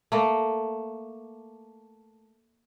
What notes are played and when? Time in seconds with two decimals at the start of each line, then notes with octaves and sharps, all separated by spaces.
0.12 A3 A#3